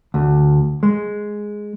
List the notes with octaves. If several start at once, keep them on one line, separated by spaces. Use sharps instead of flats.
D2
G#3